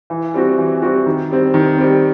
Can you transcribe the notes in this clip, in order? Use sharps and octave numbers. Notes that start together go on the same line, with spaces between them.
E3
G3 C4 F#4
E3
G3 C4 F#4
D#3
G3 C4
D#3
G3 C4